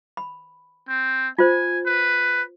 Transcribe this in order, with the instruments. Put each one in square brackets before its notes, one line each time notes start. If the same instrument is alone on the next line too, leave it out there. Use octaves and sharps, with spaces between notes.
[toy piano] B5
[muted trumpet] C4
[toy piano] F4 C5 [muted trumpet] G#5
[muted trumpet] B4